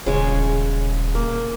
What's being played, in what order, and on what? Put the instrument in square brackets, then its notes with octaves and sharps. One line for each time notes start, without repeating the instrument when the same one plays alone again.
[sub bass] D#1 [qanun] C#3 G#3 C#5
[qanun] A#3